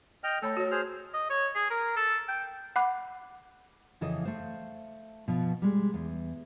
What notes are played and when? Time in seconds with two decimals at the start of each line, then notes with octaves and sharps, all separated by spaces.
0.24 D#5 G5 F6
0.42 A3 A4 C#5 B5
0.57 F#4 C#5
0.71 G#4 C5 F6
1.14 D#5
1.30 C#5
1.55 G#4
1.70 A#4
1.96 A4
2.28 G5
2.76 F#5 B5 D6 F#6
4.01 F2 C#3 E3 A4 D#5
4.23 A3 C5 F5
5.28 B2 F3
5.62 G3 G#3
5.94 E2